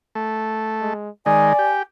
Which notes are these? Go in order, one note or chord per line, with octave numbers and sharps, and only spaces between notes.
A3
G#3
D#3 G#3 D5 G#5
G4